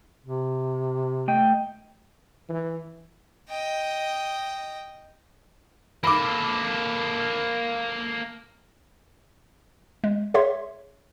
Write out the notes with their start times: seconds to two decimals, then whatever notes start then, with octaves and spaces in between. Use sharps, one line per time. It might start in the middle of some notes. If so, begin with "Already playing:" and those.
0.25 C3
1.28 A3 D#5 G5
2.49 E3
3.50 D#5 G5
6.04 A#3 A4 B5 D6
10.04 G#3
10.34 G#4 C#5 E5 C6